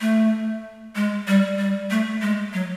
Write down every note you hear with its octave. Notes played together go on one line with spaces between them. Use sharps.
A3
G#3
G3
G3
A3
G#3
F#3